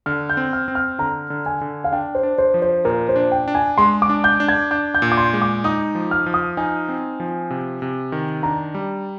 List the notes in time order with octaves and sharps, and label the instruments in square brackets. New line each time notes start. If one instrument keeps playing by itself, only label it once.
[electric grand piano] D3 [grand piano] F6
[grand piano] G6
[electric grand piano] C4
[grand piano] F6
[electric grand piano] C4
[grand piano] F6
[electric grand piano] D3 [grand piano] A#5
[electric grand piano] D3
[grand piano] G#5
[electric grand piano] D3
[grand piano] F5
[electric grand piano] D4 [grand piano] G5
[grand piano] C5
[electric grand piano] D4
[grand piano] C5
[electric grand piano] F3
[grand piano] C5
[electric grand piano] A#2 [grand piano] A#4
[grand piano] C5
[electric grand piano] D4
[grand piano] G5
[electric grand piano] D4
[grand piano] G#5
[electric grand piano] G#3 [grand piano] C6
[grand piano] D6
[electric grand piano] D4
[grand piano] G6
[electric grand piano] D4
[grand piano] G#6
[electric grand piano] D4 [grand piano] G6
[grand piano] G6
[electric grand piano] A#2
[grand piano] D6
C6
[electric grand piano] G#3
[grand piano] D6
[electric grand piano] D#4 [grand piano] D#6
[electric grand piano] F3
[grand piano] F6
[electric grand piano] F3
[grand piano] D#6
[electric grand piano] D#4 [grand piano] G#5
[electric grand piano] C4
F3
C3
C3
D#3
[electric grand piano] D4 [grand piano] A#5
[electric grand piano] G3